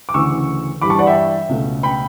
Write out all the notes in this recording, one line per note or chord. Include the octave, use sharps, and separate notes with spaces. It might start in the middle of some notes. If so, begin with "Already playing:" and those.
D6
D2 C#3 E3 C#6 E6
G2 E3 G3 B5 D6
A5 C#6
D5 F#5
E5 G5
C#2 B2 A3
G5 B5